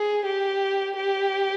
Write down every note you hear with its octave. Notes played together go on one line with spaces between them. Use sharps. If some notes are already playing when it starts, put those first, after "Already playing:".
Already playing: G#4
G4
G4